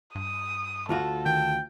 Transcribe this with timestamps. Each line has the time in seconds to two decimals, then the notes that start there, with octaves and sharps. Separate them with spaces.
0.15 G2 D#6
0.89 D2 F4 F#4 A4
1.26 D#3 G5